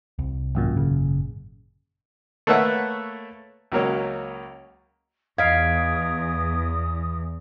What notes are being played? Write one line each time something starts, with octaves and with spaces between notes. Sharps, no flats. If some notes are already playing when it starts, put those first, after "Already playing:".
C2
G#1 F#2 A#2
C#3
A3 A#3 B4 C#5 E5 F#5
C#2 F#3 A#3 C#4
E2 D#5 F5 D#6 G#6 B6 D7